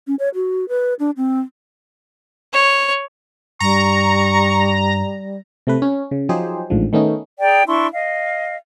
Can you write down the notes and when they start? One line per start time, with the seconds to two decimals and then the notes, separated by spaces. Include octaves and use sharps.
0.07 C#4
0.19 C#5
0.35 F#4
0.69 B4
0.99 D4
1.17 C4
2.53 C#5
3.60 G2 G3 A#5 C#6
5.67 C3 A3 B4
5.82 C#4
6.11 C#3
6.29 F3 F#3 D#4 G4 G#4 C5
6.70 A1 G#2 D3 F3
6.93 D#3 A3 B3 C#4 D#4
7.40 G#4 D5 G5 A#5
7.68 D4 E4 C6 C#6
7.92 D#5 F5